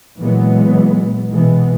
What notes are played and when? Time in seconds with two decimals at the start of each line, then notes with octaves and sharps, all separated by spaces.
0.19 A#2 E3 F#3 G#3 B3
1.30 B2 E3 G#3 B3